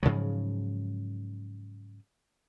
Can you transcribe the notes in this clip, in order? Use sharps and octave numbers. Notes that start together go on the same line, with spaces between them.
G#2 C#3 F3 F#3